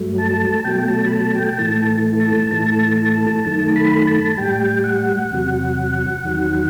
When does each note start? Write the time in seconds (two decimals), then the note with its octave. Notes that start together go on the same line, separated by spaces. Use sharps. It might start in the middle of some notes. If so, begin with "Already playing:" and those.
Already playing: G2 F#3 A3
0.18 A5
0.60 A5
0.65 B2 F#3 A3 G5
0.88 A5
1.06 B5
1.12 A5
1.35 G5
1.49 G5
1.58 A2 E3 A3 A5
2.20 A5
2.51 A2 E3 A3 A5
2.98 A5
3.45 F#2 D#3 A3 A5
3.76 B5
4.07 A5
4.38 A2 G3 G5
4.84 F#5
5.31 E2 C3 F#3
6.24 E2 D#3 F#3